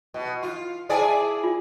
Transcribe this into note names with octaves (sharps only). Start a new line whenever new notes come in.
B2
F4
E4 G#4 C5 D5 G#5 A5
F4